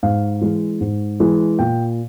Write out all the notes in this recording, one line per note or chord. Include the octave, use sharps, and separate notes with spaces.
G#2 F5
E3 G#3
G#2
E3 G#3
A#2 G5